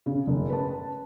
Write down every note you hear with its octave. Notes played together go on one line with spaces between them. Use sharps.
C#3
F#1
B4 A5